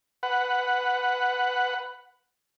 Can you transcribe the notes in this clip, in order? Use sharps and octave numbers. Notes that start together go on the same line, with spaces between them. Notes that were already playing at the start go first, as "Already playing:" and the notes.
B4 F#5